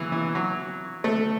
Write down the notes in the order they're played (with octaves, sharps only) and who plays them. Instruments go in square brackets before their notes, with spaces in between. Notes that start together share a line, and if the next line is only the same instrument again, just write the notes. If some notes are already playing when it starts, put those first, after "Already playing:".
Already playing: [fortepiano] E3 F#3
E3
F#3
A3